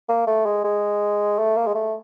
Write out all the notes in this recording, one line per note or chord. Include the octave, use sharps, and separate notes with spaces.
A#3
A3
G#3
G#3
A3
A#3
G#3
A3